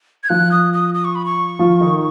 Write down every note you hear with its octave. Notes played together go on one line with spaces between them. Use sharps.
G#6
F3 F4 F#6
D#6
D#6
D#6
C#6
B5
C#6
F3 F4
D#3 D#4